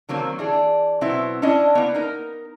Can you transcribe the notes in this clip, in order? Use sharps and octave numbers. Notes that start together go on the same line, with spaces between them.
D#3 F#3 A#3 C4
E3 D4 G#4
B2 F#3 B3 C4 E4 E5
C#4 D4 E4 D#5
A#3 B3
D#4 A#4